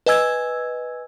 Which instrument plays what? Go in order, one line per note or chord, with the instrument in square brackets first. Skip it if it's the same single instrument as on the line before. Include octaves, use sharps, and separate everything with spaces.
[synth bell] B4 D#5 G#5 E6 G#6